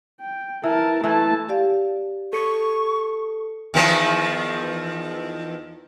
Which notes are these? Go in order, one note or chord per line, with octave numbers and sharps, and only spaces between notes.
G5
E3 A#4 A5
E3 A3 E4 A5
G4 D5 F5
A4 C#6 C#7
E2 D#3 F3